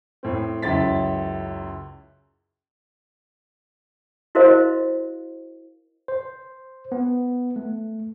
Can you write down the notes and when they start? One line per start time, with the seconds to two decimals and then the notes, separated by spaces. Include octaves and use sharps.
0.23 A2 C4
0.62 C#2 F#2 E4 E5 A6 B6
4.35 E4 F#4 A#4 C5 D#5 F5
6.08 C5
6.92 B3
7.56 A3